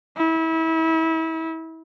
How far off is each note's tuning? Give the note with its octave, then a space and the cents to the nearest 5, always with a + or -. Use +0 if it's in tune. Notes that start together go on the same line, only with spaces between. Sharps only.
E4 -30